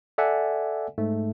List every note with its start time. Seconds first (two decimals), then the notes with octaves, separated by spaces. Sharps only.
0.18 A4 D5 E5 F#5 G#5
0.98 G#2 A3